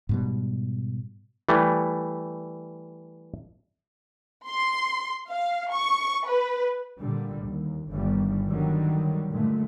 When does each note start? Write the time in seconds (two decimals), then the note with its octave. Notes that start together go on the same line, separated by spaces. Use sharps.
0.09 G#2 B2 G3
1.49 E3 G3 A3
4.48 C6
5.29 F5
5.72 C#6
6.27 B4
7.00 A#2 D3 G3
7.43 D#2
7.90 G1 D#3 G3
8.47 D3 D#3 F#3 G3
9.30 G2 A#2 D3 G#3 A3